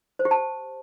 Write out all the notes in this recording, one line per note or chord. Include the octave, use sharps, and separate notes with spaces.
C5
G4
A5